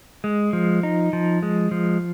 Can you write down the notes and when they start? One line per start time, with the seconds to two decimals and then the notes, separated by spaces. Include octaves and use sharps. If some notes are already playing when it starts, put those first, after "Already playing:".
0.24 G#3
0.53 F3
0.83 D#4
1.13 F3
1.43 G#3
1.71 F3